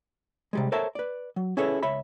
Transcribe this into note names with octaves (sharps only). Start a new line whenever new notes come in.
C3 G3 G#3
A4 A#4 C5 C#5 E5 A5
B4 D5
F#3
C#4 E4 G#4 A4 B4 C#5
C#2 C#5 E5 B5